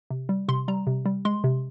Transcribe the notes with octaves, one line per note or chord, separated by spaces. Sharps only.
C3
G3
C3 C6
G3 A#5
C3
G3
G#3 C6
C3